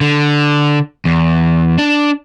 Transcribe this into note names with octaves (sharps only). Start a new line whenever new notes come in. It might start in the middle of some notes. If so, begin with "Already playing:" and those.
D3
E2
D4